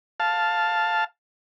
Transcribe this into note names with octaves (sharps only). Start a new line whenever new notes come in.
F5 A5